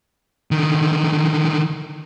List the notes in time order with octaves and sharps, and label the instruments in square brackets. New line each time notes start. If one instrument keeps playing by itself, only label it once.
[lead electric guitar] D3 D#3